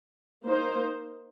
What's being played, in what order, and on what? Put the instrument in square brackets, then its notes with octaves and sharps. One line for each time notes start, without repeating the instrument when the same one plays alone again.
[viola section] A#3 D#4 C5